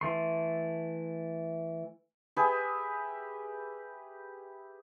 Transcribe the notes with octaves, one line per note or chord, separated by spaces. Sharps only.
E3 A3 C6
G4 G#4 B4 E5